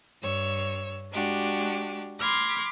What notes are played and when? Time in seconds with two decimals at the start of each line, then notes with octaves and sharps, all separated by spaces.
0.21 G2 C#5 E6
1.13 G#3 D4 F#4 G4
2.19 B5 C6 D6 F6 G#6 A#6